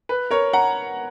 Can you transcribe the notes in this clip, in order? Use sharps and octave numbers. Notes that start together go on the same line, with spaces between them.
B4
A#4 C#5
F#5 A#5